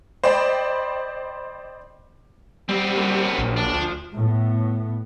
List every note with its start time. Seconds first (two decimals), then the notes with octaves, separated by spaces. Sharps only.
0.23 C5 D5 D#5 G5 B5
2.69 G3 B3 C4
2.97 F#3 A#3
3.38 A#1
3.56 D4
3.73 D2 F3
4.15 A2 B3